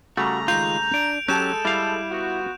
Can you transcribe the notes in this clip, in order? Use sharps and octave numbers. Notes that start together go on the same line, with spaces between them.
C#3 G3 A3 F#4 A#5
D#3 G#3 F4 G6 F7
D4 D7
F#3 G#3 C#4 G4 A4 A5 G6 E7
G3 E4 F5
B3 F4 F#4